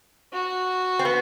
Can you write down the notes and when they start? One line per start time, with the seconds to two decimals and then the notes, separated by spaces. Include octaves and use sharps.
0.32 F#4
0.99 C4
1.05 B3